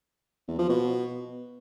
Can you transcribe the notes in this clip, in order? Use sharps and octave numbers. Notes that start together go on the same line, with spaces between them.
E2
F3
B2